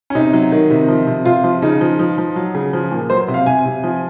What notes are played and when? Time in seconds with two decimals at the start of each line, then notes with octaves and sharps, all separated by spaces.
0.10 C#4
0.15 C3 D#4
0.33 F#3
0.52 D#3
0.70 C3
0.89 F3
1.07 C3
1.25 C3 F4
1.44 F3
1.62 C#3 D#4
1.81 F3
1.99 F3
2.18 F3
2.36 F#3
2.54 C#3
2.73 F3
2.92 A#2
3.10 F#3 C5
3.28 C3
3.34 F5
3.46 C3 G#5
3.65 C3
3.84 F3